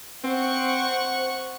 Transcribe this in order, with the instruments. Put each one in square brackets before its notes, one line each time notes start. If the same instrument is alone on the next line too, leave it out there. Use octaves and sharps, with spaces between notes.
[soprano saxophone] C4 [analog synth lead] C5 [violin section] F#5 C#6